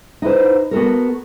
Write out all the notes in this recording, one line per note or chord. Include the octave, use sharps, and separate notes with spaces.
D#4 E4 B4 C5
B3 F#4 A4 A#4